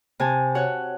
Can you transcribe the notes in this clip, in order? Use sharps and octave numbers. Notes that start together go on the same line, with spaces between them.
C3 G#5 A5
F#4 C#5 F#5